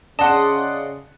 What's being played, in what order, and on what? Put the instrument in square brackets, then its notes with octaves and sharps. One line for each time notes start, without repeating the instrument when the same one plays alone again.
[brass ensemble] C#3 [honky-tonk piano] D5 F#5 [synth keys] D#5 C6 [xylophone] A5